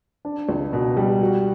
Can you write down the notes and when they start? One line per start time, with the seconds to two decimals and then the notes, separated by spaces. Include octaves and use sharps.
0.25 D4
0.49 C#2
0.73 B2
0.97 G3
1.21 F#4